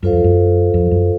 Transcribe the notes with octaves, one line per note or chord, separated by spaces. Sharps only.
F#2 F4 A4 C5 F5
F2
F#2
F2
F#2